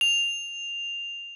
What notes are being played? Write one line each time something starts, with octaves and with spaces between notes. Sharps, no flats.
F7